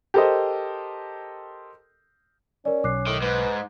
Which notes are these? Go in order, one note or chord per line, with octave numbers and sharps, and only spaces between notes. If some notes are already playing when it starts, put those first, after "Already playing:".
G4 A4 A#4 C5 D#5
C#4 A#4 D5
B1 D6 F#6 C7
A2 D#3
G#2 B4